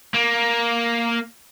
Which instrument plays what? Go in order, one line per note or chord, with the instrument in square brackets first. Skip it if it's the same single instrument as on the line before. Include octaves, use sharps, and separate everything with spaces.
[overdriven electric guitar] A#3